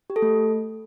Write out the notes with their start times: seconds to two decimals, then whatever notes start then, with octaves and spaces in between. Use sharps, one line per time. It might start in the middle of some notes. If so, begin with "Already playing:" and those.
0.10 G4
0.16 A4
0.22 A3